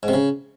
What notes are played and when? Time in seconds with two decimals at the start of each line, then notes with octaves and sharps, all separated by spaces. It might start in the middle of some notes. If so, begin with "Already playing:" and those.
0.03 G#2
0.08 C3
0.13 C#3